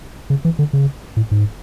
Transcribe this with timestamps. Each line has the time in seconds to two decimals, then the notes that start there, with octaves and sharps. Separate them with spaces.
0.30 C#3
0.45 E3
0.59 D3
0.73 C#3
1.17 A2
1.31 G#2